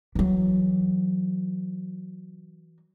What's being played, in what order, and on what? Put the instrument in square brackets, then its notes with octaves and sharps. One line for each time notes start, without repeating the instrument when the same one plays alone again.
[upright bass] E3 F#3